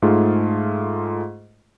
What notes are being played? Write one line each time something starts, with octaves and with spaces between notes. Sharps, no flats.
G#2 A3 F4 G#4